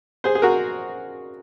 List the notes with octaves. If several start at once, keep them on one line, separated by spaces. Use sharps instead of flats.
G#4 C5
G#4
F#4 A#4